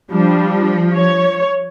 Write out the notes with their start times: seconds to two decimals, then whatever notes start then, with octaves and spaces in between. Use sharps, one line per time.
0.10 F3 G3 D4
0.94 C#5